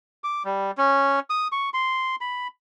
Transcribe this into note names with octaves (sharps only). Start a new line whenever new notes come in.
D6
G3
C#4
D#6
C#6
C6
B5